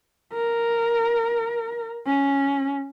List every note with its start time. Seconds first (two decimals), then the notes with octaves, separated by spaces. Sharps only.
0.33 A#4
2.07 C#4